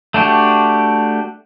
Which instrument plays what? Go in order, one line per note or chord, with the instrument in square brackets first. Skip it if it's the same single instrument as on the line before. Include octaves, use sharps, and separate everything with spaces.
[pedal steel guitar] A3 D4 F#4 G4